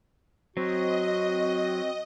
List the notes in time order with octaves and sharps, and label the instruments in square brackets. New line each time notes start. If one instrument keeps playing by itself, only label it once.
[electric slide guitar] F#3 [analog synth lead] C4 [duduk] F#4 [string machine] D#5